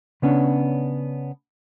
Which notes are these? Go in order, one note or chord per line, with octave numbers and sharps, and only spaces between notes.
C#3 B3 C#4 D4